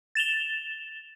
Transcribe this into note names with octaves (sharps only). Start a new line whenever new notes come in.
A6 E7 F7 G7